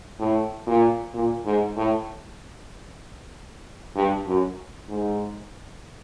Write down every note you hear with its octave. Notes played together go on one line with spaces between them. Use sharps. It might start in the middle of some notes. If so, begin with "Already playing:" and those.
A2
A#2
A#2
G#2
A2
G2
F#2
G#2